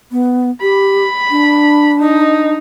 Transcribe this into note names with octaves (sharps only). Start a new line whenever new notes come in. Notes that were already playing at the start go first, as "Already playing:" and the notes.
B3
G4 B5
D4
D#4